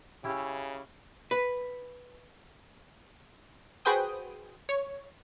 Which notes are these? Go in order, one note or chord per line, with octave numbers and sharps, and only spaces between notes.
C#3 C#4 E4 G4
B4
F#4 G#4 B4 C5 G5 D#6
C#5